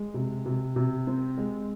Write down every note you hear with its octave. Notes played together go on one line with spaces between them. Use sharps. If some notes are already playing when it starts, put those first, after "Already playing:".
Already playing: G#3
C3
C3
C3
C4
G#3